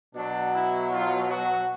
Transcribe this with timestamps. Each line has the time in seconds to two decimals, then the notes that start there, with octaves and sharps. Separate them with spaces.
0.14 B2 F#3 D4
0.53 E4
0.91 F4
1.29 F#4